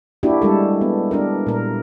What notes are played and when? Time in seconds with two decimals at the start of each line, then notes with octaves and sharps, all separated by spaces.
0.23 A#3 D4 E4 F#4 G4
0.42 G3 G#3 A4
0.81 B3
1.11 D4 G4 A#4
1.47 A#2 A#4